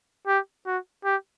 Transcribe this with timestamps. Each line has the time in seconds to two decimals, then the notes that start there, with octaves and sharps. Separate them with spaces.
0.27 G4
0.67 F#4
1.05 G4